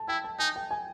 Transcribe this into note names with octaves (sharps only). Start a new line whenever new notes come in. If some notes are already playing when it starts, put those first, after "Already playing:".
Already playing: A5
E4 G5
A5
D#4 G#5
G5
G#5